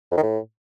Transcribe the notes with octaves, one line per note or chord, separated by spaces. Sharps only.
F2
D#3
A2